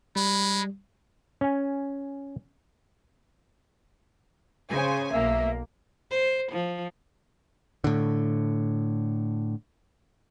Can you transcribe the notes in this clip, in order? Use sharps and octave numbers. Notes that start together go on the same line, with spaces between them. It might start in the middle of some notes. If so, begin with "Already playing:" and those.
G3 G#3 B5
C#4 G#5
C#3 C5 G#5
B1 A#3 E5
C5
F3
A2 D3